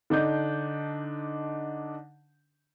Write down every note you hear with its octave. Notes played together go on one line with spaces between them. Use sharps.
D3 D4 D#4 G6